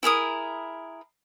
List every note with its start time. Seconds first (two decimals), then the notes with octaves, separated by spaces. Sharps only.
0.03 E4 G#4 A#4 D#6